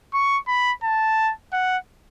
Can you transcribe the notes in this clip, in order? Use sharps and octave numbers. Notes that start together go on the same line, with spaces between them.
C#6
B5
A5
F#5